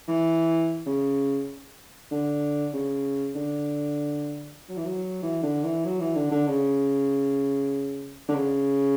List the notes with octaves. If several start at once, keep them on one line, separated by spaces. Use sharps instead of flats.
E3
C#3
D3
C#3
D3
F#3
E3
F#3
E3
D3
E3
F#3
E3
D3
D3
C#3
D3
C#3